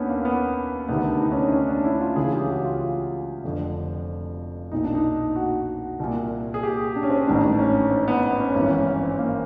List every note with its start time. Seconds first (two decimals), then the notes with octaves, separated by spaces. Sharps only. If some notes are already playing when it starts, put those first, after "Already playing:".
Already playing: D#2 D#3 B3 C#4 D4
0.09 A#3
0.25 B3
0.89 D2 C3 D#3 B3
1.05 D4
1.21 D#4
1.32 C#4
1.37 D4
1.52 C#4
1.69 D4
1.84 E4
2.01 F4
2.16 C#2 C#3 E3 G#4
2.33 G4
2.48 F#4
2.65 F4
3.44 F1 F2 D3
4.72 B1 A#2 D#4
4.84 D4
4.95 D#4
5.36 F#4
6.00 C2 A#2
6.54 G#4
6.63 G4
6.96 D4
7.03 C#4
7.10 C4
7.17 C#4
7.27 A1 G#2 D#3 D4
7.59 C#4
7.91 C4
8.08 B3
8.23 B3
8.39 C#4
8.55 G#1 G2 E3 C#4
8.71 C#4
8.87 C#4
9.03 C4
9.18 A#3